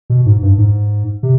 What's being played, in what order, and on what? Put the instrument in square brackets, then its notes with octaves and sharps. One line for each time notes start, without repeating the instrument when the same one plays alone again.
[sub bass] B2
G#2
G2
G#2
C3